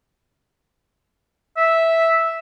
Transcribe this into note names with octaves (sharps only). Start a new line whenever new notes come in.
E5